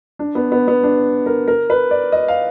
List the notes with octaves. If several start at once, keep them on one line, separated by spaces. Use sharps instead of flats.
D4
B3
B3
B3
D4
A#4
A#4
B4
D5
D#5
F5